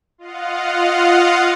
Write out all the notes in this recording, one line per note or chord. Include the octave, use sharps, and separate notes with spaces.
F4 D#5 F5 F#5